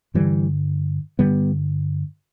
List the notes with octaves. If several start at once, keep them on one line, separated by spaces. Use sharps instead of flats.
G2 D3 E3 G3
G2 D3 G3 B3